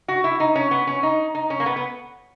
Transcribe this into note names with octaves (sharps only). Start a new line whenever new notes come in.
F#4
E4
D#4
C#4
B3
C#4
D#4
D#4
C#4
A#3
B3
B3